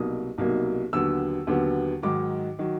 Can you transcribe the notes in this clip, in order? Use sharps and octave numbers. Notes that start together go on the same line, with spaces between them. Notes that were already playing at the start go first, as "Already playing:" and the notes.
Already playing: C2 B2 F#3 A#3 D#4 D#6
C2 B2 F#3 A#3 D#4
D#2 D3 F#3 B3 E6
D#2 D3 F#3 B3
G#2 D#3 F#3 D6
D#3 F#3